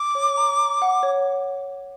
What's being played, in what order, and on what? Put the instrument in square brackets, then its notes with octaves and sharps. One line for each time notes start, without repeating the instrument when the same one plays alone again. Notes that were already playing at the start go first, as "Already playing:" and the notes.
Already playing: [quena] D6 [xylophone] E6
[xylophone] C#5
A#5
A#5
F#5
C#5